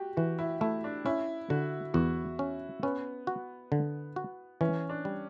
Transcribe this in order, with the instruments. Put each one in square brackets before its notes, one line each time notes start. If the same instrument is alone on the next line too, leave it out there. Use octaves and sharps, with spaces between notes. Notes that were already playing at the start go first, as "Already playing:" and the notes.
Already playing: [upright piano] F#4 G4
[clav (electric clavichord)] E3 [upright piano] F#4
[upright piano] E4
[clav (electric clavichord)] A3 [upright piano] E4
[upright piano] D4
[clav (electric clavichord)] C#4 [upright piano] E4
[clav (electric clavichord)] D3 [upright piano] F#4
[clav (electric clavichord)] E2 [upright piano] F#4
[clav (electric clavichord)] C#4
[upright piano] B3 [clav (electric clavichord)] C#4
[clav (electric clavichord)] F#4
D3
F#4
[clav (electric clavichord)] E3 [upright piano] C#4
[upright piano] D4
[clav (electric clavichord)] G3